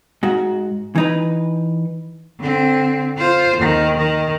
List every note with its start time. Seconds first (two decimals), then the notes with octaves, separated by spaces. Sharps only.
0.23 G#2 F#4
0.96 E3 D#4 B4
2.40 D3 C4
3.17 F4 C5
3.57 D#2 D#3
3.97 D#3